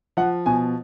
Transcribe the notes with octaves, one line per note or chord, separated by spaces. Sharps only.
F3 F#5
B2 G#5